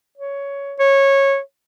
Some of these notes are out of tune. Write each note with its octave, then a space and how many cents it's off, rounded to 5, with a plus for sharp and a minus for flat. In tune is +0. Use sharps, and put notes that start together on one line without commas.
C#5 +10
C#5 -15